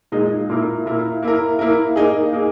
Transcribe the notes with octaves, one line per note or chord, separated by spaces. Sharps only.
A#2 G#3 D#4
A#2 A#3 E4 A#4
A#2 A#3 E4 A#4
A#3 E4 A#4
A#3 E4 A#4
A#3 D#4 G#4
A#3 D#4 G#4